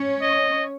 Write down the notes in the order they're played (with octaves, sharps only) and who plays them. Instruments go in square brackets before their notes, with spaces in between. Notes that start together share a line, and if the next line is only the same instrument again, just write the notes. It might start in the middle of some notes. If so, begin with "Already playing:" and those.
Already playing: [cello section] C#4 C#5
[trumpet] D#5